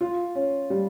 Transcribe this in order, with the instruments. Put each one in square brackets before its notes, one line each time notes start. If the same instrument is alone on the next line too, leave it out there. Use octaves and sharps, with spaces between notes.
[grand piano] F4
C#4
G3